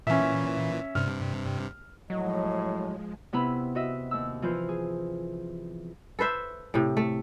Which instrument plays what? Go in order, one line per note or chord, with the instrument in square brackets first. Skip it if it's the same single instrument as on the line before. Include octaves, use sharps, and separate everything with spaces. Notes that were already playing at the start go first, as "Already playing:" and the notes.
[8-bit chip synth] A#2 E3 [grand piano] C#4 E5
[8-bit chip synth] G2 C3 [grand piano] F6
[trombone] A2 [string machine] F3 G#3 [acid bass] F#3 [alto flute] D#5
[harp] C3 B3 E4 B5
F#4 D#5 E5
D#2 E6
E3 F3 F4 C5
G#4
[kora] A4 B4 C5 E5
A2 C3
A3